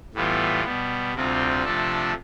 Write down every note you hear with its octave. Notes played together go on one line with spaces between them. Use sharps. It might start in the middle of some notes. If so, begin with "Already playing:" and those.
A2 E3 G3 B3 F4
B2 G3 B3
D2 C3 G3 C4 F4
C3 F3 A3 D4 A4